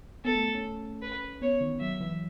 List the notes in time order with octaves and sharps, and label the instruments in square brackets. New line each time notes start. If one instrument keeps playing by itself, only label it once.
[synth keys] B3 [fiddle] A4
[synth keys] A3
C#4
[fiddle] B4
[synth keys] B3 [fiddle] C#5
[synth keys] D#3
[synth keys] F#3 [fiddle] E5
[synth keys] E3